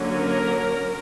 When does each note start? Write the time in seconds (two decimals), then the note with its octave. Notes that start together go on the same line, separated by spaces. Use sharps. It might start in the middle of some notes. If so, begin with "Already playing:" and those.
Already playing: D3 F#3 A#3 C#4
0.16 A#4